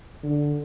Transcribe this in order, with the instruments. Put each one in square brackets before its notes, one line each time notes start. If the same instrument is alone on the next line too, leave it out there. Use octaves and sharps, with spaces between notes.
[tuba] D3